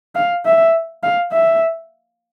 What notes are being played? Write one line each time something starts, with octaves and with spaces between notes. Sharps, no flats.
F5
E5
F5
E5